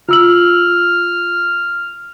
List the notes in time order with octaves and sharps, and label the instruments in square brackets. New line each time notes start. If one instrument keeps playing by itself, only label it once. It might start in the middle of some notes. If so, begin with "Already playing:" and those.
[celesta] F4 E6 F#7 [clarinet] F6